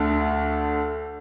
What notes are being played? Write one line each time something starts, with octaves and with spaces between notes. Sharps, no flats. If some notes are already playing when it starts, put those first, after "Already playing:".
Already playing: D2 D3 A3